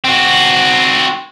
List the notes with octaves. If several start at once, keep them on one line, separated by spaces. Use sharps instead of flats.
C4 F#4